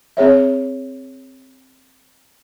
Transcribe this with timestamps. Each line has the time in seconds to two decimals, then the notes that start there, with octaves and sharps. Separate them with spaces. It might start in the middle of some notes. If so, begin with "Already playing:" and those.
0.17 C4 G#4 C#5 E5